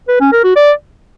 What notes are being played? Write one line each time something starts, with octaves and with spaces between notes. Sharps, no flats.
B4
C#4
A#4
F#4
D5